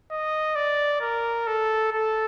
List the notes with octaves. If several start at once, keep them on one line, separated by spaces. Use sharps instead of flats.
D#5
D5
A#4
A4
A4